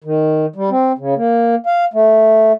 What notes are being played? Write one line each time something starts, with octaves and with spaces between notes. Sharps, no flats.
D#3
G3
C4
C#3
A#3
F5
A3